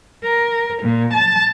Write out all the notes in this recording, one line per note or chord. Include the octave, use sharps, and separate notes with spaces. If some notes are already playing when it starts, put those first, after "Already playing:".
A#4
A#2
A5